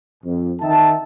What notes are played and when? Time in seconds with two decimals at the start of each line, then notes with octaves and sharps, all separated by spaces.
0.24 F2
0.61 D#3 D#4 E5 G5 A5